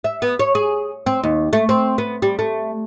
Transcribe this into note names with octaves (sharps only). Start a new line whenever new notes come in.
E5
B3
C#5
G#4
C4
D#2
A3
C4
B3
G3
A3